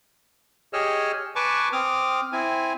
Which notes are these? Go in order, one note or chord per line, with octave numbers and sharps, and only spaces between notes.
G4 G#4 C#5 D#5 E6 F6
B4 G#5 A5 C#6 D6
C4 D6 D#6 F6
C4 E4 G#5